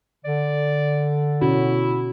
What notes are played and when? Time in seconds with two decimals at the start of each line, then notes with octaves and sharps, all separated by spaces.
0.25 D3 D5
1.41 B2 C#4 E4 F#4